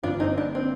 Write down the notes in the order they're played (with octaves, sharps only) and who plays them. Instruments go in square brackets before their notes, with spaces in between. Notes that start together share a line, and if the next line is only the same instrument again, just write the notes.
[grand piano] G1 G2 F3 A#3 [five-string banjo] D4 F4
[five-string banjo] C4 D#4
D4
C4